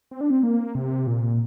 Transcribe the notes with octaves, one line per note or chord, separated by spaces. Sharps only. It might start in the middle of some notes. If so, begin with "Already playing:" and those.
C4
D4
C4
A#3
C3
A#2